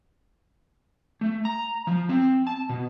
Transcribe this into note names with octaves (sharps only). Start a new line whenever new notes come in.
A3
A#5
F3
C4
A5
B2